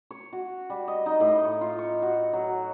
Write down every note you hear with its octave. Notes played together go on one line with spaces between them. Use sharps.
C#5
F#4
G3
D#5
D#4
A2
C#5
F4
C#5
F#4
F#3